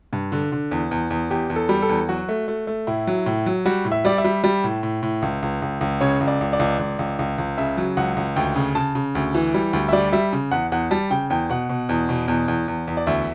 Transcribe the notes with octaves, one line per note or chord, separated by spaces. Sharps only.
G2
D3
D3
E2
E2
E2
E2 G4
E2
A4
G3
A4
E2
F#3 F#4
A3
A3
A3
A2 E4
F#3
A2
F#3
G3 F#4
A2
E5
G3 D5
E5
G3
G3
A2
A2
A2
C#2
C#2
C#2
C#2
C#3 C#5
C#2
D5
C#2
D5
C#2
C#2
C#2
C#2
C#2
C#3 E5
F#3
C#2 F#5
C#2
D2 G5
C#3
C#3 A5
C#3
D2
E3
G3
D2
E5
G3 D5
G3 E5
C#3
E2 F#5
E2 F#5
G3 A5
C#3 G5
E2 G5
B2 F#5
B2
E2
B2
E2
E2
E2
E2
D5
D2 E5